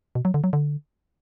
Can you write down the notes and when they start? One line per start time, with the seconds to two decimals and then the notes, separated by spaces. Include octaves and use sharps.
0.15 B2
0.25 F#3
0.34 D3
0.44 F#3
0.53 D3